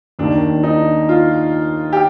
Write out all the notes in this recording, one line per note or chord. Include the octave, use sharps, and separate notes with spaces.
D#2 D#3 D4
D#4
F4
G4